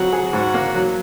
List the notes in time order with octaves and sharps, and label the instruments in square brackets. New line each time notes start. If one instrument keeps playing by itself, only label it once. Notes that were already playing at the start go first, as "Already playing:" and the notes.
Already playing: [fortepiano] F2 F#3 [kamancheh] F#4
[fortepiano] G#4
[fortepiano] G#2 [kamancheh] F#4
[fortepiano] A#3
F#3